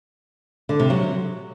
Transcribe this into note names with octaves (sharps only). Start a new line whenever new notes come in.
D3
C3
F#3